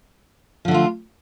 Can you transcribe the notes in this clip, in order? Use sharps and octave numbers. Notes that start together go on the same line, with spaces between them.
D3 F3 A3 F4